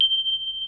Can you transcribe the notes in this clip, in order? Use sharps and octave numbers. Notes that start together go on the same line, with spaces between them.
G7